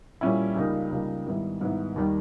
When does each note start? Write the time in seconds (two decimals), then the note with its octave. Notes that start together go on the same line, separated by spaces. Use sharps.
0.21 A#2 G3 C#4 E4
0.56 C#2 C#3 G3 A#3 D#4
0.91 C#2 C#3 G3 A#3 D#4
1.26 G#2 D#3 G3 B3 E4
1.61 G#2 D#3 G3 B3 E4
1.96 D#2 D#3 G3